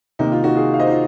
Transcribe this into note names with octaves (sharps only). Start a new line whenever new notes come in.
C3 D#3 A#3 D#4
F4
D#4 F#4
F4 G#4
F5
C5 D#5
D#4
F4